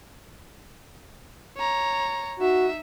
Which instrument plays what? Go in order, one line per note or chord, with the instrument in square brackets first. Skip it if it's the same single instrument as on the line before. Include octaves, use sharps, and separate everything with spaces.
[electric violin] C#5 A#5
[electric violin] D#4 E5 [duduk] F#4